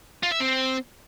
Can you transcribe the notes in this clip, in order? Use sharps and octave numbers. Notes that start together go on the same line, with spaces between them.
F4
E5
C4